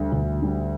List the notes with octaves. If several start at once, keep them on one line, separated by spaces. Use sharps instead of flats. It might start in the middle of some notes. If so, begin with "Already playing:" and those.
Already playing: D2 D3 G3
D2
D3 G3